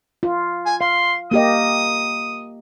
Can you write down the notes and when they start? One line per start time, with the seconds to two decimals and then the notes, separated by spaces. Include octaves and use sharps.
0.23 F4
0.66 G#5
0.81 F5 C6
1.31 A#3 G4 D#5 D#6